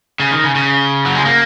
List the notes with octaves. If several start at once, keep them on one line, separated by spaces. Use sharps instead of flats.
C#3
D#3
C#3
C#3
F#3
G#3
A#3